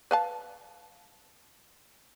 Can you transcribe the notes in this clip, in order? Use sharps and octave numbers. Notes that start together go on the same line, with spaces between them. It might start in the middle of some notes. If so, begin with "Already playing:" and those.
B4 F5 A5